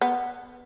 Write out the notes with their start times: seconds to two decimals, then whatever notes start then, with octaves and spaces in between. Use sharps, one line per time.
0.02 B3